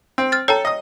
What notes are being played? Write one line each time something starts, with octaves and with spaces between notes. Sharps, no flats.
C4
F6 A6
A4 C#5 G5 A#5
D#5 D#6